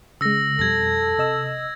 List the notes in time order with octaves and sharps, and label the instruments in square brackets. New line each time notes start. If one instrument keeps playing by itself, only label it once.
[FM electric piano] C#3 G#3 [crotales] E6 A#6
[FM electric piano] F2 B2 G3 [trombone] A4 [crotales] G#6 A#6
[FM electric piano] C3 D#5 E6